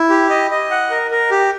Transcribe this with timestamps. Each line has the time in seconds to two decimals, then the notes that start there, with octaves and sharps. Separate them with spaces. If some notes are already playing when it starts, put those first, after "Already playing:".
Already playing: E4
0.10 G4
0.30 D#5
0.51 D#5
0.71 F#5
0.90 A#4
1.11 A#4
1.31 G4